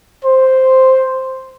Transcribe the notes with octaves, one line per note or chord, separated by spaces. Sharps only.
C5